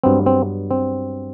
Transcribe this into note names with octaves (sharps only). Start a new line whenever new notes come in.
G2 F#3 B3 C4
C4
C4